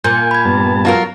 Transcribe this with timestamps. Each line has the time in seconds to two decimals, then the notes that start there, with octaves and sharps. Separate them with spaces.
0.04 A#2 G#5 G6
0.31 B5 G#6
0.45 G2 B3 A5
0.85 F#3 F4 A#4